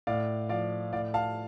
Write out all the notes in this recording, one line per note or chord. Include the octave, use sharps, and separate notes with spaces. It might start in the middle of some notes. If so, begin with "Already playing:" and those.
A2 D5 F5
F3 D5 F5
A2 D5 F5
F5 A5